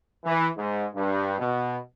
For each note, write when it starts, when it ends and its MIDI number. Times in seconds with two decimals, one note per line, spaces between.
0.25 0.48 52
0.57 0.86 44
0.95 1.35 43
1.39 1.77 47